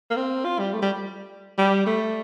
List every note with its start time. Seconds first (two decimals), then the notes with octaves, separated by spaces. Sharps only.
0.10 A#3
0.16 C4
0.45 F4
0.59 G3
0.73 A3
0.82 G3
1.58 G3
1.86 A3